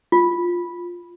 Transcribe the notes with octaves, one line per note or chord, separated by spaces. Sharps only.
F4